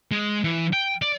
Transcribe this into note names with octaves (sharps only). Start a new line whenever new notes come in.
G#3
E3
G5
D5